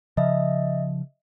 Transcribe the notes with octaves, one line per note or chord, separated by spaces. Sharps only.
C#3 F3 D#5 E5